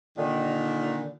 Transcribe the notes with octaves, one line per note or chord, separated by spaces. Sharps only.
A#2 D3 D#3